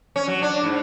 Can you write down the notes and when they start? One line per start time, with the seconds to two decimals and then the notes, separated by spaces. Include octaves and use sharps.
0.16 C#4
0.27 F#3
0.42 D4
0.64 G#2